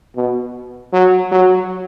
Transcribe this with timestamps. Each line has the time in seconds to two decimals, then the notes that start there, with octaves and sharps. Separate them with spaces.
0.16 B2
0.93 F#3
1.32 F#3